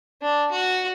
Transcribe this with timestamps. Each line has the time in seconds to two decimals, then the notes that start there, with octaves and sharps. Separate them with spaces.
0.22 D4
0.52 F#4